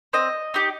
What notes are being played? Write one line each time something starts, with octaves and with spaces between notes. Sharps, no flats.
C4 D#5
D#4 G4